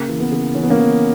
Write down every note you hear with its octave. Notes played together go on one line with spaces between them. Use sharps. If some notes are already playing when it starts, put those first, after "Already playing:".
Already playing: C#3 A#3
E3
B3
C#3
E3 C#4
B3
A#3 C#4
E3 B3